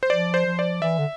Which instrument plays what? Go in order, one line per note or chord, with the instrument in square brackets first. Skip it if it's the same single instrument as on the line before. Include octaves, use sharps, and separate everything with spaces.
[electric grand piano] C5
[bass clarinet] F3 [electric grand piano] D5
[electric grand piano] C5
[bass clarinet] F3
[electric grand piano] D5
[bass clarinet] E3 [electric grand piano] E5
[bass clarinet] D3